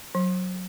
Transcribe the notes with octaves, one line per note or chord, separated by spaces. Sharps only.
F#3